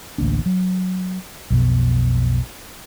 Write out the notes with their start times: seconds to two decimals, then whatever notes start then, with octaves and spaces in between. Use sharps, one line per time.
0.18 A1 D2 A#3 D4
0.46 F#3
1.50 B1 F2 B2